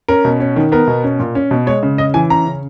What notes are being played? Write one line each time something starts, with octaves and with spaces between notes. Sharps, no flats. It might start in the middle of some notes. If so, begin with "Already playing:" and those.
C#4 A#4
B2
C#4
D#3
B3 A#4
B2
C#4
A#2
C#4
B2
G#3 C#5
C#3
C#4 D#5
E3 G#5
C#4 A#5
C#3